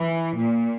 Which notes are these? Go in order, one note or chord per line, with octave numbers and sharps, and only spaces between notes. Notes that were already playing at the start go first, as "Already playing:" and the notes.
Already playing: E3
A#2